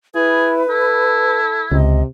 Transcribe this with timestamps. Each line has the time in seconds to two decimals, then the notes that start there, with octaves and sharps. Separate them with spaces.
0.15 E4 G#4 B4
0.69 E4 A4
1.72 C#2 C3 D#5